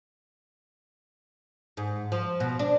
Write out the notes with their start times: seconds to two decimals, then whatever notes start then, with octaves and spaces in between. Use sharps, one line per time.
1.77 G#2
2.12 F3
2.40 B2
2.59 D4